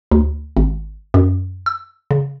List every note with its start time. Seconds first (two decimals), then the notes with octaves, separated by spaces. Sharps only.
0.11 D2
0.57 G#1
1.14 F#2
1.66 E6
2.11 C#3